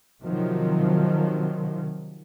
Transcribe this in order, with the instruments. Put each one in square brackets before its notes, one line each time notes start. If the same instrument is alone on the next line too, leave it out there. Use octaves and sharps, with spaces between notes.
[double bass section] C3 D#3 F3 F#3